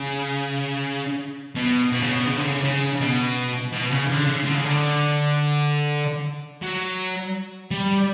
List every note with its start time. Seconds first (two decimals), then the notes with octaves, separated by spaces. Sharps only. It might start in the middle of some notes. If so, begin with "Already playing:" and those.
Already playing: C#3
1.55 B2
1.92 B2
2.02 C#3
2.11 B2
2.27 C#3
2.37 D3
2.46 C#3
2.64 C#3
3.01 B2
3.72 B2
3.91 C#3
4.10 D3
4.27 C#3
4.45 D3
4.55 C#3
4.64 D3
6.62 F#3
7.71 G3